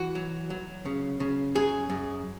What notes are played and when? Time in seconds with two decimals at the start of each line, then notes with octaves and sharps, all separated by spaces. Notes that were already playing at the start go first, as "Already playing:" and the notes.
Already playing: E3 F#4
0.15 F#3
0.50 F#3
0.86 C#3
1.20 C#3
1.55 F#2 G#4
1.90 F#2